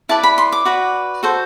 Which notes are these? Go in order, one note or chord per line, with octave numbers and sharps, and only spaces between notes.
E4 B4 D5 A5
B5
C6
D6
F#4 B4 D5
F#4 A4 C5